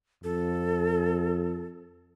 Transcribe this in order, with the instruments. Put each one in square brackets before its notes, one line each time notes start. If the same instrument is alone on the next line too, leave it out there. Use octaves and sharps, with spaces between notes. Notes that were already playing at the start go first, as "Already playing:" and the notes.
[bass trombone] F2 [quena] A4